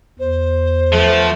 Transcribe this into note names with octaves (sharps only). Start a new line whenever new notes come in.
E2 C5
F3 A3 B3